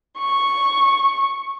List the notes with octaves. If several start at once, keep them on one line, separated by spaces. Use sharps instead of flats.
C#6